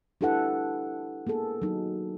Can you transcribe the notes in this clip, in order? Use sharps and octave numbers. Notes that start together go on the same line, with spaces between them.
D4 E4 G4 A4 B4 F#5
A#3 B3 G#4 A4
F#3 D#4